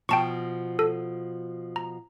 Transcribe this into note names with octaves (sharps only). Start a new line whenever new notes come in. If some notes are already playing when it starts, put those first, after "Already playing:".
B2 F3 G5 A5 C#6
A4
A#5